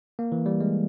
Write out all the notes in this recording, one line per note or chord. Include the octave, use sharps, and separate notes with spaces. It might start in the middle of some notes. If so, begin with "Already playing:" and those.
A#3
E3
G3
G#3